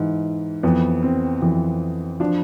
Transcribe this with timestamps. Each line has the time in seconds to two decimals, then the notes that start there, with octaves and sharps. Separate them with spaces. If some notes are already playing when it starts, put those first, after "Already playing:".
Already playing: G#2 E3
0.63 F2 E3 B3
1.03 C4
1.42 F2 E3
2.20 F3 D4